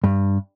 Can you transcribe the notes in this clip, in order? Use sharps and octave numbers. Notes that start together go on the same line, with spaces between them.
G2